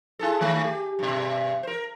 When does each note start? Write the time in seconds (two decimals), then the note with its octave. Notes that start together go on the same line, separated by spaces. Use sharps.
0.19 E4 G#4 A4
0.41 D#3 A3
0.64 G4
0.99 G2 B2
1.63 A#4 C5